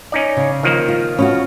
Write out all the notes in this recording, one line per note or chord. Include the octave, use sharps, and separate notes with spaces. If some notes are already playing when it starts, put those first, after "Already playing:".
C#4 D#4 D5
C#3
D#3 F3 A#3
F4
B2 C#4 F4 F#4